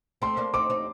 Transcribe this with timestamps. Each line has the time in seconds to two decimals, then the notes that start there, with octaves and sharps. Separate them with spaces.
0.22 A3 C4 C6
0.37 A#3 D4
0.54 C4 D#4 D6
0.70 C4 D#4